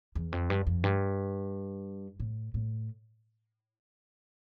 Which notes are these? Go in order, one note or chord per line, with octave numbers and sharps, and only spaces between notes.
E2
F2
G2
F2
G2
A2
A2